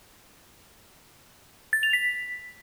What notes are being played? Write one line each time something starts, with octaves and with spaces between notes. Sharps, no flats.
A6
F7
B6